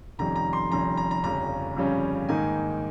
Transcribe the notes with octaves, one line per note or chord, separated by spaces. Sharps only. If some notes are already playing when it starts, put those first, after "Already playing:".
F1 F2 D#3 G3 C#4 A#5
A#5
C6
F1 F2 D#3 G3 C#4 A#5
A#5
A#5
G1 F2 C#3 G3 C#4 A#5
G1 F2 C#3 G3 C#4
G#2 D#3 A#3 D#4 G#5